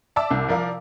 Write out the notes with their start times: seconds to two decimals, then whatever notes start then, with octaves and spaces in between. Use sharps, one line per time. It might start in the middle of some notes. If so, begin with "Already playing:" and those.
0.16 D5 E5 A5 D6 E6
0.31 C2
0.49 F3 A#4 D5 F5